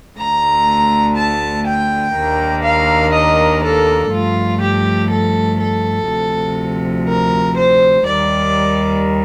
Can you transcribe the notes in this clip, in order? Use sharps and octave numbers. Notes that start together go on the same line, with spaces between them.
D2 D3 A3 A#5
A5
G5
D#2 D#3 A#3 D4
F5
D#5
A4
G2 F3 A3 F4
G4
A4
A4
D2 C3 F3
A#4
C5
D#2 D#3 G3 D5